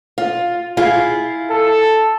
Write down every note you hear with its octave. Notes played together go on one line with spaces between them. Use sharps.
F4
E4 F4 G#4
A4